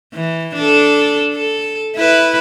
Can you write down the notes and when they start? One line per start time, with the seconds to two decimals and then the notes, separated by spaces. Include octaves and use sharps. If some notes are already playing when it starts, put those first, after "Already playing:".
0.14 E3
0.56 D4 A4
1.34 A4
1.96 E4 B4